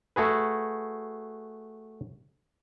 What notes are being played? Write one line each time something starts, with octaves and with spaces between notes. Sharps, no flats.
A3 F#4 G#4 B4